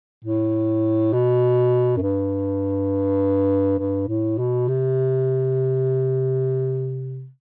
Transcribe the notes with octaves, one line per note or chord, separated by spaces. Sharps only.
A2
B2
F#2
G2
G2
A2
B2
C3